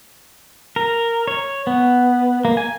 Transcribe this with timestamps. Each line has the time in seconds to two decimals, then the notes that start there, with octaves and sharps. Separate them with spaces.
0.76 A#4
1.28 C#5
1.67 B3
2.45 A#3
2.57 G#5